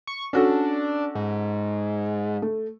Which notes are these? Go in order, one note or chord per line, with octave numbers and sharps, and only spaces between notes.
C#6
C#4 D4 F#4 A4
G#2
A3